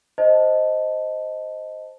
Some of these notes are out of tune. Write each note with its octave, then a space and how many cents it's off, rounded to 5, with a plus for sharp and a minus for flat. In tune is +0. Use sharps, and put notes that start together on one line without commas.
C5 +0 D#5 +0 A5 +0